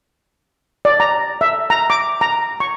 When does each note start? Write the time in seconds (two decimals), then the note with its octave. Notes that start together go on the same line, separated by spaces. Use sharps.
0.85 D5
1.00 A#5
1.41 E5
1.70 A#5
1.90 D6
2.21 A#5
2.60 C#6